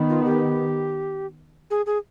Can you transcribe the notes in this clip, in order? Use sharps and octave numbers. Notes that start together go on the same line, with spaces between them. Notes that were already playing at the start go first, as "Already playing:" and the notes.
Already playing: D#3 B3
F4
G4
G#4
G#4